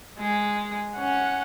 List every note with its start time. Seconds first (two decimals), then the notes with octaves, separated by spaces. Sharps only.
0.18 G#3
0.97 C#4 F#5